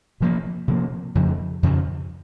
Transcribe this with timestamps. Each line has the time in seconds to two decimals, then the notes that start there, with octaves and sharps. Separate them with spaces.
0.20 C3 F3 A#3
0.68 C3 F3 A#3
1.15 F2 C#3 F3
1.63 F2 C#3 F3